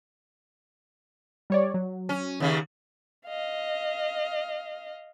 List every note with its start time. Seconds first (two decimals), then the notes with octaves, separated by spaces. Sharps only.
1.50 G3 C#5 D5
1.74 F#3
2.09 C#4
2.40 D#2 C#3
3.27 D#5 F5